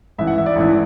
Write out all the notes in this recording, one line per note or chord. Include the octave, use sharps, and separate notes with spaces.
A1 G#2 E3 E5
F#5
E5
D5
A1 G#2 E3